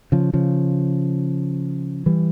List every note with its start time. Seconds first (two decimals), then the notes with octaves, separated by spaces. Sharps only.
0.12 C#3 F3
0.33 C#3 F3
2.06 E3 G3